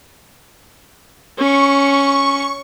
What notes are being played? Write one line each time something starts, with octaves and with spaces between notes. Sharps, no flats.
C#4 C#6